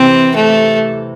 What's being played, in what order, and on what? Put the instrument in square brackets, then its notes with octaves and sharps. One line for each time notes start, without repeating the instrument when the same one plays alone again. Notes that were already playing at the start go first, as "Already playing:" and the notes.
Already playing: [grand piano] C3 E3 [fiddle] C4
[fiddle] A3